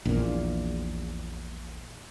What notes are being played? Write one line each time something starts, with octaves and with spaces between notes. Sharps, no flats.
A#1 E2 A#2